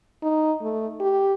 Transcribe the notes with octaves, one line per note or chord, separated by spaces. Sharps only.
D#4
A3
G4